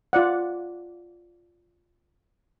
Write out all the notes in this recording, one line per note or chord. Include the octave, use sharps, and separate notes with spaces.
F4 D5 F#5